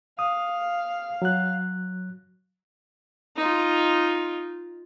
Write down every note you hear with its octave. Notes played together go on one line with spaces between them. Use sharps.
F5 D#6
F#3 F#6
D#4 F4